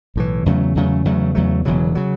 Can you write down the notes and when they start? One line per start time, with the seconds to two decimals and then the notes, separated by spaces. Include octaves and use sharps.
0.16 B1 A2 E3
0.46 E2 C#3 F#3 A3
0.75 E2 C#3 F#3 A3
1.05 E2 C#3 F#3 A3
1.35 E2 C#3 F#3 A3
1.65 E1 E2 C#3 F#3
1.95 C#3 F#3